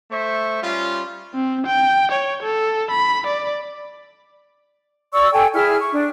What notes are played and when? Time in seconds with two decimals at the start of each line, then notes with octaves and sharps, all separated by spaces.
0.11 A3 C5 E5 C#6
0.62 G3 C#4 F4
1.35 C4
1.67 G5
2.11 C#5
2.43 A4
2.91 B5
3.27 D5
5.13 D5 C#6 E6
5.33 A4 G5 G#5
5.54 E4 G#4 F6
5.79 C#6
5.93 D4